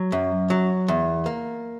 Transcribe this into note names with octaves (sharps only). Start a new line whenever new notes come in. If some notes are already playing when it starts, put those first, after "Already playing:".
Already playing: F#3
F#2
F#3
E2
A#3